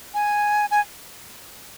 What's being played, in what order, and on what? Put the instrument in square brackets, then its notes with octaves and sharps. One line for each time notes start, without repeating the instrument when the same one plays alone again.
[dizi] G#5
G#5